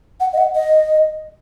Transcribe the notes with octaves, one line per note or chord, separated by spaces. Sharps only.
F#5
D#5
F#5
D#5